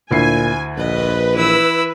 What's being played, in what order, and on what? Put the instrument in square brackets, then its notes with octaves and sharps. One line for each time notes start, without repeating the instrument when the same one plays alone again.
[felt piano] D2 E4 C7 [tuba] A#2 [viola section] G#5
[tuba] A#1 [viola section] B4 [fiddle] D#5
[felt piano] E3 [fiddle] E4 E6